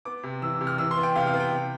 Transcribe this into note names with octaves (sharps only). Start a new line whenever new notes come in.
B3 D6
C3
E3 E6
E6
C3
F6
E3 E6
C6
B3
G5
C3 F5
F5
B3
G5
C3